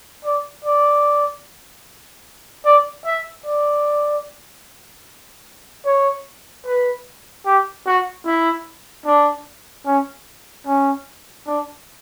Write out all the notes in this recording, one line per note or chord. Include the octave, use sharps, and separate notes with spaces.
D5
D5
D5
E5
D5
C#5
B4
G4
F#4
E4
D4
C#4
C#4
D4